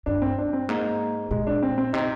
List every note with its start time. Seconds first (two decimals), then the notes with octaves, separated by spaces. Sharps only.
0.06 G2 D4
0.22 C4
0.38 D4
0.53 C4
0.69 G#2 A#3
1.31 A#2 G#3
1.47 D4
1.63 C4
1.78 C4
1.93 C3 D#4